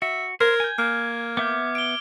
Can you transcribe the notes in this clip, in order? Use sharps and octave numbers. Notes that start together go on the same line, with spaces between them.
F#4 E5
A#4 C5 G#6
G#5 G6
A#3 F6
B3 E5 D6 G6
D7 G7